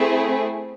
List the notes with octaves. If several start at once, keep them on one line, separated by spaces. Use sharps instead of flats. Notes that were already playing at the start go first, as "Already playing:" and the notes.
Already playing: A3 C4 E4 G#4